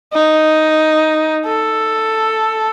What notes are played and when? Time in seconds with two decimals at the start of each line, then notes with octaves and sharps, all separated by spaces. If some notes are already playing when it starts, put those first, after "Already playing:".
0.14 D#4
1.46 A4